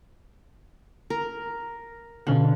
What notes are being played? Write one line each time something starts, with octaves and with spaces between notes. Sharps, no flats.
A#4
B2 D3 C#4 F5